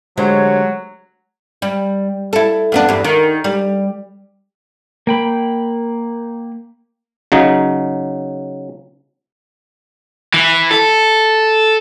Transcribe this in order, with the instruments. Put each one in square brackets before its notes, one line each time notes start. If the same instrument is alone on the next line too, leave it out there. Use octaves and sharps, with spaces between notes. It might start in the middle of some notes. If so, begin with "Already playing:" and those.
[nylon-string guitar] D3 G4 C5 [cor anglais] F#3 [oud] G#3 [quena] C#5
[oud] G3
E4 A4
F2 B3 D4
E2 G2
D#3
G3
[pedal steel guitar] A#3 G5 B5
[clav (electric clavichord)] C#3 F#3 D#4
[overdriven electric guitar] E3
A4